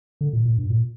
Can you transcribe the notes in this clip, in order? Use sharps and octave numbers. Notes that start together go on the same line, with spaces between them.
D3
A#2
A#2
G2
A#2